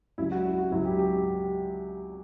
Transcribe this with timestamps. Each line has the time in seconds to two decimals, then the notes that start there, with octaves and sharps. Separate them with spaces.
0.18 C#2 C#3 F#3 E4
0.32 F#4
0.45 E4
0.58 F#4
0.72 C#2 C#3 F#3 E4
0.85 G4
0.99 G4